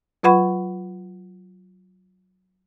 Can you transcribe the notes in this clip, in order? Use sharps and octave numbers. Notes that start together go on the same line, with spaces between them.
F#3 F4 B4 F#5 B5 C#6